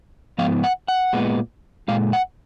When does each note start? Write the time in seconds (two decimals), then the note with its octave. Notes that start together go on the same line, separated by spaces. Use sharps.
0.39 G#2 F3 B3 F5
0.64 F#5
0.88 F#5
1.13 A#2 G#3 B3
1.88 A#2 G#3 F5
2.13 F#5